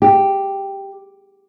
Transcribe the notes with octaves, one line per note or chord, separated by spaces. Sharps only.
G4